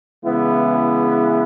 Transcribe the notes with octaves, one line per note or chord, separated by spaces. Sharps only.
C#3 E3 G#3 B3 E4